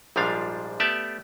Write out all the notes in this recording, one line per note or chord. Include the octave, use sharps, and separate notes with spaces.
A#1 G#2 F3 G3 D4 F5
A3 B3 G4 D5 E5 A5